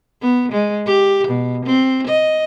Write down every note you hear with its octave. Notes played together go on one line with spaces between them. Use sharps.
B3
G#3
G4
B2
C4
D#5